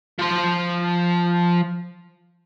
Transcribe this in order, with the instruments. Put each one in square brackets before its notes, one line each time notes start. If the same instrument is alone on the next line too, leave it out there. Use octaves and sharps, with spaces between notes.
[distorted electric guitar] F3 C6